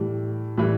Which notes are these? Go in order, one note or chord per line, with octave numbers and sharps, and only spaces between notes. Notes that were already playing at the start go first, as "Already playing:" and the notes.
Already playing: A2 E3 G3
A2 E3 G3